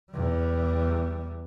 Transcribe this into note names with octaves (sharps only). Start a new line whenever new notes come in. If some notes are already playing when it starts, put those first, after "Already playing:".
E2 G3